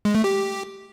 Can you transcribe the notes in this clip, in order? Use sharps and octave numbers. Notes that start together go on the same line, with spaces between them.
G#3
A3
G4